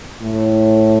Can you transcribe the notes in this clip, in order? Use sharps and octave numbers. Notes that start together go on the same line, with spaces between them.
A2